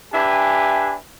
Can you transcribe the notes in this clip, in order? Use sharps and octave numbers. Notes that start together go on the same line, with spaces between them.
D4 G4 B4 E5 G#5